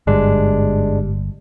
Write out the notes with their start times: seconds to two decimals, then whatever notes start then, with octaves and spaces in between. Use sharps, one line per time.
0.07 G1 G#2 G3 G#3 D4